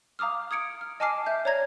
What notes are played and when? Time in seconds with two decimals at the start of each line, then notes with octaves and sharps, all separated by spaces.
0.19 F5 A#5 D6 D#6 F6
0.51 D#6 G#6 C#7 D7
0.81 F6
1.00 D#5 G#5 A5 D6 F6 C7
1.26 E5 G6
1.45 C#5 D5 A#5 G#6 A#6